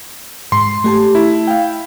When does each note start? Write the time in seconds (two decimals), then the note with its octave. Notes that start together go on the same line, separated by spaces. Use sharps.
0.52 G#2 C6
0.84 A3 G4 A5
1.15 E4
1.47 F5 G5